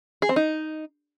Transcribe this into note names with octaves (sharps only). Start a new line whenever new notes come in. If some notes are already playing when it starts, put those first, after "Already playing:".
G#4
C4
D#4